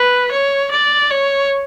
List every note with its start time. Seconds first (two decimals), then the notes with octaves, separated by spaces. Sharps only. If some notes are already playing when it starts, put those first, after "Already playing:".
Already playing: B4
0.31 C#5
0.71 D5
1.10 C#5